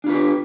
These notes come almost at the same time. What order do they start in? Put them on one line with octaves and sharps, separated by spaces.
D4 F4 B4 G4